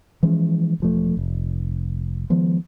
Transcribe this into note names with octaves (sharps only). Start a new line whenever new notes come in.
E3 F3 G#3 C#4
E1 F3 A3
F1
D#3 F3 G#3 B3